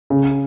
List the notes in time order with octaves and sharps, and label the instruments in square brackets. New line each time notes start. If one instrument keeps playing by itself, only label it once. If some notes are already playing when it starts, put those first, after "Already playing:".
[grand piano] C#3